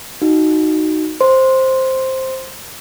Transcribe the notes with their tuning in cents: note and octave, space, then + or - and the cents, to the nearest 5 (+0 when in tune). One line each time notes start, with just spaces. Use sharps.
D#4 +0 F#4 +0
C5 +5 C6 +0